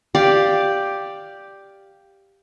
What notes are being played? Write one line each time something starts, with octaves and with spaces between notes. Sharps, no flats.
G4 D5 F5